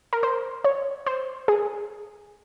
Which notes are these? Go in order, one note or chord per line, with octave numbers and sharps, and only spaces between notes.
A#4
C5
C#5
C5
G#4